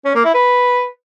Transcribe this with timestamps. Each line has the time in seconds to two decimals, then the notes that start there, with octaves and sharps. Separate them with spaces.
0.05 C#4
0.15 A#3
0.25 E4
0.35 B4